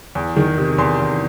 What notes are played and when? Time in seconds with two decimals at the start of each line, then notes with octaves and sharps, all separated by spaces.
0.15 E2
0.36 D#3
0.58 C3
0.78 E2 C6
1.00 E2